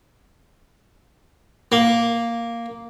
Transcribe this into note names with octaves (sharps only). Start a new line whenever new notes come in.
A#3